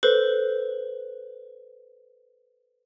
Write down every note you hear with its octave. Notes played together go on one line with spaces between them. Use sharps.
A4 B4 C5